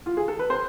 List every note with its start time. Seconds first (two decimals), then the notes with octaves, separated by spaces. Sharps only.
0.06 F4
0.17 G#4
0.28 A4
0.39 B4
0.49 C4 C5